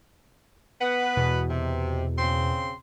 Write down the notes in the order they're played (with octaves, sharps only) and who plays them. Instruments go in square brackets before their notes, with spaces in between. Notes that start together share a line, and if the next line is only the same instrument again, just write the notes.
[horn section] B3 B4 [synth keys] F#5
[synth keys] E2 B2
[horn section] C3
C#3 C4 C6